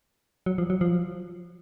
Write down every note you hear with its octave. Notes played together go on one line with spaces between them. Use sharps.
F#3
F3
F#3
F3